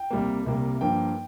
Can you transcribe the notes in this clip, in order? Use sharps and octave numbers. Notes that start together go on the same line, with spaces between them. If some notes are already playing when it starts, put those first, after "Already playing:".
Already playing: G5
C2 C3 G3 A#3
C2 C3 G3 A#3
G2 F3 A#3 G5